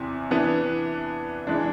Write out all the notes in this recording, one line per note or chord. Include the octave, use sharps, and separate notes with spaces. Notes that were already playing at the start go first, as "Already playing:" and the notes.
Already playing: E2 C3
E3 B3 D4
E3 G#3 D4